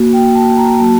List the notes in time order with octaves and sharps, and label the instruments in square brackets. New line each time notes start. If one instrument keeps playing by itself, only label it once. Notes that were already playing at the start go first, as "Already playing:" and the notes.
Already playing: [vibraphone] A#3 F#4
G5
A5
A#5
F#3 A#3 F#4 A5